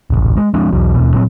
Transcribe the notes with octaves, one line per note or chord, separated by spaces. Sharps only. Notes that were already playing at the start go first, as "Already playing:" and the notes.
D#1 A1
G#3
F3 G#3 C4 D4
B1 E2 F#3
D#2 B2
A#2 F#3 C4